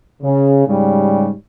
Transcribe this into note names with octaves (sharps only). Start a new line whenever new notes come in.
C#3
G#2 C#3 G3